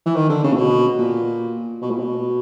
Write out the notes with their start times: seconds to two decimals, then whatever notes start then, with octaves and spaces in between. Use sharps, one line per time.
0.06 E3
0.15 D#3
0.29 D3
0.44 C#3
0.53 A#2
0.57 B2
0.98 A#2
1.82 B2
1.90 A#2
1.99 B2